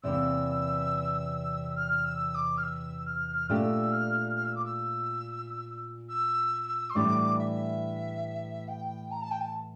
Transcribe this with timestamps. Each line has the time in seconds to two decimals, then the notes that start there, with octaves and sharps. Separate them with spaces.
0.03 E2 C3 E3 A#3 E6
1.76 F6
2.05 E6
2.34 D6
2.57 F6
2.63 E6
3.06 F6
3.49 A#2 A3 D4 G4 E6
3.92 F6
4.35 F6
4.45 E6
4.55 D6
4.65 E6
6.09 E6
6.90 C6
6.95 A2 E3 G3 D4 G4 D6
7.38 E5
8.68 G5
9.11 A#5
9.21 A5
9.31 G5
9.41 A5